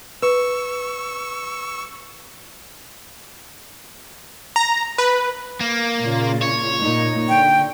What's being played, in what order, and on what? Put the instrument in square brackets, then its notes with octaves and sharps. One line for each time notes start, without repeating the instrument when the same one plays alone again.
[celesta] B4 [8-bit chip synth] C#6 E6
[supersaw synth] A#5
B4
[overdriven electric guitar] A#3
[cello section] A#2 C#3 F4
[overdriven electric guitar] C#5
[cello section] A#2 D#4
[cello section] D3 [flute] G5